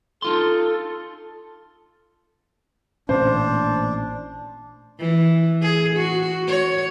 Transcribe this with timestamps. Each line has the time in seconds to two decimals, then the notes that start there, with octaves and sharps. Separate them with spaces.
0.22 D#4 F4 A4 C6
3.09 A1 A#2 C#4 D4 C5
4.99 E3
5.62 G#4
5.97 F#4
6.48 C#5